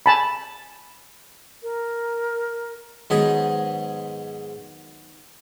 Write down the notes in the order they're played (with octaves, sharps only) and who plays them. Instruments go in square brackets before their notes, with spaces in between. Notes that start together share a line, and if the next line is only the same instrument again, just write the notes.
[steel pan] G#5 A5 B5
[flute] A#4
[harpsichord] G#2 G#4 [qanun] D#3 F#3 B3